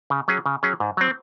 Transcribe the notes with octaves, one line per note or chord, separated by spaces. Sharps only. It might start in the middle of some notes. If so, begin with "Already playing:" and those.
C#3
F#3 C#4 G#4
C#3
F#3 C#4 G#4
G#2
F#3 C4